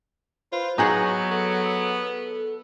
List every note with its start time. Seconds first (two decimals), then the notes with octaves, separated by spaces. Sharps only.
0.52 F4 B4 C5
0.78 F#3 B3 D#4 G#4 F#5 C#6
1.31 B3 A4